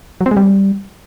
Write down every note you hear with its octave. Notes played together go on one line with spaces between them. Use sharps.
F#3
C4
G#3
G3